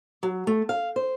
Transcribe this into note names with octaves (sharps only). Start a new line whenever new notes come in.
F#3
A3
F5
C5